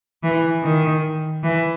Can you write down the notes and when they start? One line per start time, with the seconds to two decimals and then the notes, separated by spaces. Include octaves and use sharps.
0.23 E3
0.63 D#3
1.43 E3